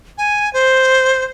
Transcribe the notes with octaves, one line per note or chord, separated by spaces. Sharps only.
G#5
C5